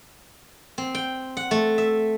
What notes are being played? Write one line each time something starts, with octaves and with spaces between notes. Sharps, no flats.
C4
G5
F#5
A3
E5